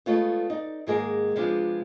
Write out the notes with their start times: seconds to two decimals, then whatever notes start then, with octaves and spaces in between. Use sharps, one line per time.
0.06 G#3 A3 B3 F4 B4 C#5
0.50 D#4 D5
0.87 G#2 D#3 G#3 A#3 G#4 A#4
1.36 C3 F3 G#3 B3 D4 F4